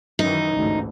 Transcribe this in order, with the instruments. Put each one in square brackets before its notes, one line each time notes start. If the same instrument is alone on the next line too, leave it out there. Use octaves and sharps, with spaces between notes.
[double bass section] F#2 D#3 E3 [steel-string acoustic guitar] D#4
[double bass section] A1 D2 G#2